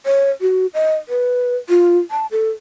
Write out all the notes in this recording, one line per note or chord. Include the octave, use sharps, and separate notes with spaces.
C#5
F#4
D#5
B4
F4
A5
A4